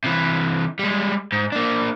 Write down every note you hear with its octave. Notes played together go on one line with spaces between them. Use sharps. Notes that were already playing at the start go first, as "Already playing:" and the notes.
C3 E3
G3 G#3
G#2
A#3 D4